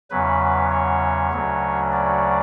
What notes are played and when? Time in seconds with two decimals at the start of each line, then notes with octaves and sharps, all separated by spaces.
0.11 E2 C#3 F#3 B4
0.71 C#5
1.32 D2 C#3 F#3
1.92 D5